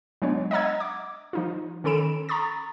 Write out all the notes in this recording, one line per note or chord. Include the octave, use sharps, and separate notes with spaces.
F#3 G#3 B3 D4 C#5
D#5 E5 F#5 A#5 E6 G#6
D6
F3 D#4 F4
D#3 C#4 A4 B5 D7 E7
A#5 B5 C#6 D#6 A6